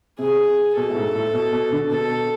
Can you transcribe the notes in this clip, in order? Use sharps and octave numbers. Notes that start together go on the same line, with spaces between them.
C3 G#4
B2 A4
A2
G#2
A2
B2
B2
D3
B2 A4